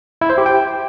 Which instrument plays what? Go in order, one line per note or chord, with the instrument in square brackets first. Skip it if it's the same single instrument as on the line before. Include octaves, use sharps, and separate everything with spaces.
[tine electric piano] E4
C5
G4
G5